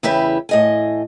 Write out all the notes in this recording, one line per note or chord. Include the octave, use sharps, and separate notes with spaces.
E2 C#3 E4 G4 B4 E5
A2 D#5 G#5